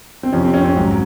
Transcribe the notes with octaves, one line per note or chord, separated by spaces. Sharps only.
C4
F2 C3 F3 C#4
C4
C#4
C4
C#4
G#1 G#2 F#3